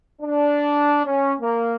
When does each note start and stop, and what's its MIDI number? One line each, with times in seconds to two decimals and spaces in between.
0.21 1.01 62
1.05 1.33 61
1.40 1.76 58